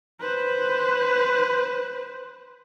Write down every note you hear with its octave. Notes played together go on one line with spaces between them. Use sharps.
B4 C5